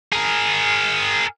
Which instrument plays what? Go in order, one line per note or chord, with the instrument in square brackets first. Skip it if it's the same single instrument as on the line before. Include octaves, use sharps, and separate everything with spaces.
[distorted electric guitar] G#4 A#4